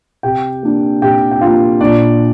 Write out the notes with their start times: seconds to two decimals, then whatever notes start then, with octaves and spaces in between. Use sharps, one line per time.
0.23 C3 G4 G5
0.63 A#3 D4
1.02 C3 G4 G5
1.31 G5
1.41 A#3 D4 F4 F5
1.81 A#2 D4 D5